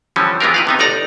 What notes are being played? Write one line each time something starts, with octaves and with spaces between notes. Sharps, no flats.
D3 E3 F3 G3 C#4
E3 G#3 B3 F4 G4 A#4
D#3 B4 F5
C3 B3 D#4
G1 D#4 D5 A#5